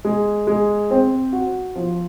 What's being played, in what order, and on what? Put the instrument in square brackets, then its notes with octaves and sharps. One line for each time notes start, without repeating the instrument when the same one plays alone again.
[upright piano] G#3
G#3
C4
F#4
F3